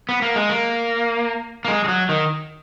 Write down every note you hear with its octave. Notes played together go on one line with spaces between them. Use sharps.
B3
A#3
G#3
A#3
A#3
G#3
G#3
F#3
D#3